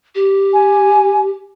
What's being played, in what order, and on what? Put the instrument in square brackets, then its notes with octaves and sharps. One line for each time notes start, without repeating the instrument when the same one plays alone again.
[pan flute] G4
[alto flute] G#5